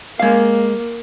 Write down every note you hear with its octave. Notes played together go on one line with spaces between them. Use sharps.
G#3 A#3 F5